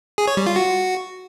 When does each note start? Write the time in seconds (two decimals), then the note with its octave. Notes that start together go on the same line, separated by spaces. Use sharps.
0.18 G#4
0.28 C#5
0.37 G3
0.47 F4
0.56 F#4